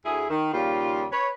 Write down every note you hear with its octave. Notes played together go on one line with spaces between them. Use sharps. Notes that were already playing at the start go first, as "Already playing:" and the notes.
D2 E4 G#4
D#3
D#2 C#3 G3 F4
B4 C#5